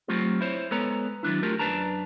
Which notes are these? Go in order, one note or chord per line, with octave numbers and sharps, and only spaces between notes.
F#3 A3 C4 F4 G4
E4 C5 C#5
G#3 B3 A4 B4 C#5 A#5
D#3 F#3 D4 E4
A3 F4 G4 A#4
F#2 D4 B4 A5 A#5